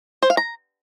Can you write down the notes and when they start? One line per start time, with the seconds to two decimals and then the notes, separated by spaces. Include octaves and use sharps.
0.23 C5
0.30 F5
0.37 A#5